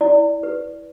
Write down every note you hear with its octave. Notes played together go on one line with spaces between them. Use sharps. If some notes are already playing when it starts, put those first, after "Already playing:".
E4 D5
B4